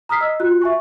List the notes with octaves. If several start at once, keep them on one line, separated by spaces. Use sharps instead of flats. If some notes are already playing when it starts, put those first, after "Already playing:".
A#5 D#6 F6 B6 C7
D#5 E6
F4 F#4 F#6
E5 G#5 C#6